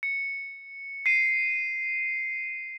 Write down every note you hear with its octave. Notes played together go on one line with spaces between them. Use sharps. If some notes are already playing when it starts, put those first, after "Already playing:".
C#7
C7 D#7